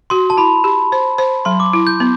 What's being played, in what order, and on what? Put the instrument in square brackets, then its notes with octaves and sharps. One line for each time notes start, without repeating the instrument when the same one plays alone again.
[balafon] F#4 [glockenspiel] C6
[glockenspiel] A5
[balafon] E4 [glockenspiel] B5
[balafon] G4
C5
C5
[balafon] F#3 [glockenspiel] C6
[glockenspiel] D6
[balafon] E4
[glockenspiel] G6
[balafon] B3